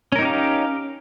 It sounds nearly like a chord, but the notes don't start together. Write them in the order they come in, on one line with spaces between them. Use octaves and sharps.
C#4 A#4 D#4 G4 F5